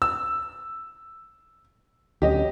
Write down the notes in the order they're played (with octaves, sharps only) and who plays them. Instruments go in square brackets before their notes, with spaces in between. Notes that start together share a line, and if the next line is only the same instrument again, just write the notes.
[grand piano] E6
[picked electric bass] D2 F#3 C#4 [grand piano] G4 D#5